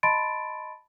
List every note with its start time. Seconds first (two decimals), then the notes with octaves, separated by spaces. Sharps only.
0.03 D#5 A5 B5 C6 A6 D7